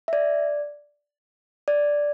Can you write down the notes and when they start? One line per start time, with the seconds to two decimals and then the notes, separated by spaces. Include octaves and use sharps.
0.08 E5
0.13 D5
1.68 D5